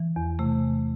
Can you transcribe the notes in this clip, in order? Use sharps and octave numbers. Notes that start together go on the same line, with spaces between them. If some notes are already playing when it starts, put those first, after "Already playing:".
Already playing: E3
E2
C3 A3